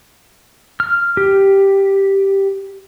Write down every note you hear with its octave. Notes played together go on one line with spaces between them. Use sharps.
F6
G4